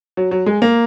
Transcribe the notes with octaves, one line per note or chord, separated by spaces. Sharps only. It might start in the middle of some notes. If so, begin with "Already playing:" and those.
F#3
F#3
G#3
A#3